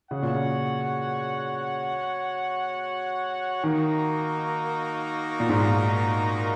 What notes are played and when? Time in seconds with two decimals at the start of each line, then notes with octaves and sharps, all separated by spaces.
0.11 C#3 F#4 C#5 F#5
0.22 A#2
0.35 C#3
3.64 D#3 A#3 D#4 F#4 A#4
5.40 A#2
5.49 G#2
5.60 A#2